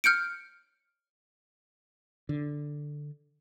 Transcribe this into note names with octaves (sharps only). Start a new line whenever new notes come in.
F6 G6 C#7 D7
D3